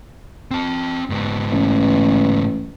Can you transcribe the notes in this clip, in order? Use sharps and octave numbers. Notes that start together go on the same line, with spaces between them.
C4 A5
G#2 B3
A1